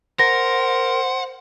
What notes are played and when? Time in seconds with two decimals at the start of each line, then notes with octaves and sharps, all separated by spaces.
0.19 A#4 C5 F#5 A#6